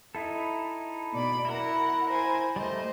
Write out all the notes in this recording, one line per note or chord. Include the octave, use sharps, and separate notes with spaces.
D#4 E4 A4
B2 D5 B5
E4 A#4 F#5
A#4 C5 G#5
G3 A3 C5 D#5